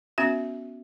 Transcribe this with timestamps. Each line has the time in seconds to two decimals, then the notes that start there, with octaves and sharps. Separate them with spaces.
0.18 B3 C#4 F#4 E5